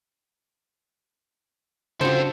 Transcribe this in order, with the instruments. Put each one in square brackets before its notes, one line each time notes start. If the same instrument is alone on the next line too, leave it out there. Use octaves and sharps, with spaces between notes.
[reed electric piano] C#3 F#4 [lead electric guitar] C4 A4 [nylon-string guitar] D4 F4 [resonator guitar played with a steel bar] C5